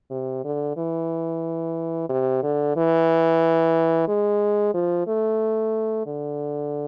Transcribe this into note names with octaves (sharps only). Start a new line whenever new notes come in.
C3
D3
E3
C3
D3
E3
G#3
F3
A3
D3